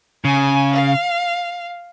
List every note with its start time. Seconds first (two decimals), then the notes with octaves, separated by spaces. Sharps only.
0.25 C#3 G#5
0.73 F5